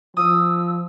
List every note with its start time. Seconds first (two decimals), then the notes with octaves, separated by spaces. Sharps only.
0.17 F3 D#6 E6